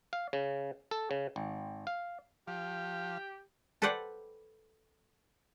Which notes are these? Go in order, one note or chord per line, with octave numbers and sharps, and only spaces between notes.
F5
C#3
A4
C#3
G#1
F5
F3 G4 F5
A4 B4 C5 D5 F#5 G5